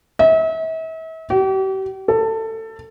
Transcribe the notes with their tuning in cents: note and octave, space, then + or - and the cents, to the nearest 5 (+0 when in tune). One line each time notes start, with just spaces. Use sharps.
E5 -40
G4 -40
A4 +20